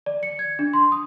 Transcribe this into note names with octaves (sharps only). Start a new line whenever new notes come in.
D5
C#7
G#6
D4
C6
D#6